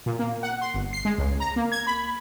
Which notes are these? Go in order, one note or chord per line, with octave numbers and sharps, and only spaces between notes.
A#2
A#3
F#5
C6
G1
C7
G#3
C#2
A#5
A#3
G#6
B5